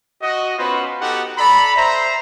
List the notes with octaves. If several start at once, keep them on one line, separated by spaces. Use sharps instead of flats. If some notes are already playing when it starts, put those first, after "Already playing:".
F#4 D#5
B3 C#4 F4 F#4 B4 C5
B3 D#4 F#4 G4 A4 F#5
A4 D5 A#5 B5
C5 E5 A#5